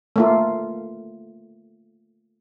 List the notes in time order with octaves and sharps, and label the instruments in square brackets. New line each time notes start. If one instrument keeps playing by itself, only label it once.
[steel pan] A3 A#3 F4